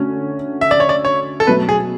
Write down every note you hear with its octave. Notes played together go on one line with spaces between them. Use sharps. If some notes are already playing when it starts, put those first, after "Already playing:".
Already playing: D3 A3 C#4 F#4
E5
D5
C#5
D5
C#5
A4
B2 F#3 A3 B4
G#4